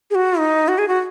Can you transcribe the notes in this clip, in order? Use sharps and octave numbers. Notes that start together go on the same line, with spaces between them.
G#4
F#4
D#4
F#4
G#4
F#4